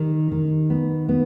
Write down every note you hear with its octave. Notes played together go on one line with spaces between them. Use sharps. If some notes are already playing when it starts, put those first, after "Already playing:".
Already playing: D#3 G3
D#3
B3
B3